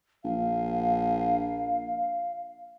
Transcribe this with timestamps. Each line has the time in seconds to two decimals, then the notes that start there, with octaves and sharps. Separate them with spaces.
0.24 A#1 F5